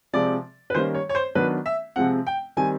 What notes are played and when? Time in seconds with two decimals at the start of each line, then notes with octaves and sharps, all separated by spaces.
0.13 C3 F3 G#3 C4 D5
0.70 B4
0.74 D#3 G3 A#3 C#4 C5
0.94 C#5
1.09 C#5
1.15 C5
1.35 D#3 F#3 B3 D4 B4
1.66 E5
1.96 C3 F3 G#3 C4 F#5
2.27 G5
2.57 D#3 G3 C4 G#5